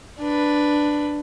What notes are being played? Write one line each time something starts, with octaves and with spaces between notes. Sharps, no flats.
D4 B4